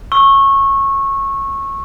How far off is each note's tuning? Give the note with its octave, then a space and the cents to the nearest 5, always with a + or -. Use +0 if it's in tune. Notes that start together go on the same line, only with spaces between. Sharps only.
C#6 -20 E6 +0